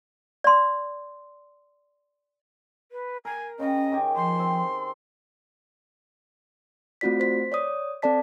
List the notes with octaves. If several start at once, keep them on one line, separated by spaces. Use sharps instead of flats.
D5 C6
B4
A#4 G#5
C#3 C#4 C#5 D#5 G5
D#3 G4 G#5
F3 C6
C4
A3 C4 F4 F#4 D5 B6
C5 B6
C#5 D5 D#6
C4 A4 D5 A5 B6